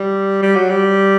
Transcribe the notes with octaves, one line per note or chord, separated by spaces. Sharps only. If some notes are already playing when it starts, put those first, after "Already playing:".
Already playing: G3
G3
F#3
G3